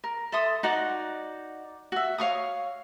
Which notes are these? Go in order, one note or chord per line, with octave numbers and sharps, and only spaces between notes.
A#4
A4 E5 C6 D#6
D#4 F#4 D5 F#5
F#4 E5
C#5 F5 C#6 D#6